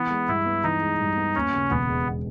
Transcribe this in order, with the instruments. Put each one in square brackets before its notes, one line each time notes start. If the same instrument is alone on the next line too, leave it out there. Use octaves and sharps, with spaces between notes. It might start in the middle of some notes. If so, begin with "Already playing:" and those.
Already playing: [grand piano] E3 [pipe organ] B3
[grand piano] G#3
[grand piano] G2 [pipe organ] E4
[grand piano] B3
[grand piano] E3 [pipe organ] D#4
[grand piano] G#3
G2
B3
[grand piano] D#2 [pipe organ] C#4
[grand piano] C#3
[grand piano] E1 [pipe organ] B3
[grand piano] G#3